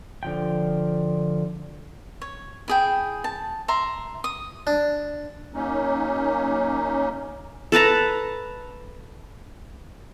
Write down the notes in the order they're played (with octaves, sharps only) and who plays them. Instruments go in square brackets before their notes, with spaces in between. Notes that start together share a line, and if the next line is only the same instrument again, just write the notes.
[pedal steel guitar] D3 F3 G5
[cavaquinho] C#5
E4 G#4 G5
A5
E5 A#5 C6
D#6
[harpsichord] D4
[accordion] F#3 A#3 C#4 D#4
[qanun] A4 B4 A5 A#5